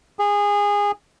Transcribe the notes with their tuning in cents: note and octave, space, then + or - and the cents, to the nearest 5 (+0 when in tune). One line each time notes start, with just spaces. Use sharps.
G#4 -25